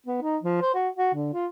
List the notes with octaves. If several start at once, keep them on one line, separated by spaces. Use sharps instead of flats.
B3
D#4
F3
C5
F#4
F#4
D3
F4